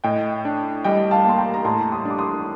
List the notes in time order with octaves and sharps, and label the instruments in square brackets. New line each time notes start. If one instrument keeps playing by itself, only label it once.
[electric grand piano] A2 [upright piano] D#5 G5
[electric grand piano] D4
[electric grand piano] G3 [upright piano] D#5 G5
[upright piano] F5 A5
[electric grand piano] A#3 [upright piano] C6
[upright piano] G5 A#5
A#5
[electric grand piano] A2 [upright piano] A5 C6
[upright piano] C6 D#6
[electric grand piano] D4
[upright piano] D6
C6 D#6